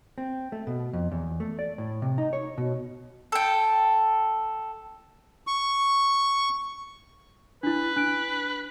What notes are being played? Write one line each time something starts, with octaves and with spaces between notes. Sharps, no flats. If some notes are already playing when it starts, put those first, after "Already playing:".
C4
A3
B2
F2
E2
A3
D5
A2
C3
D#4
C#5
B2
A4 G5
C#6
D4 E4 B4
D4 F#6 D7